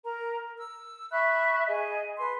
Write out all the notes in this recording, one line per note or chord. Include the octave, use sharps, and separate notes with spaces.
A#4 A#5
E6
E5 B5 C#6 F#6
G#4 D#5
B4 C6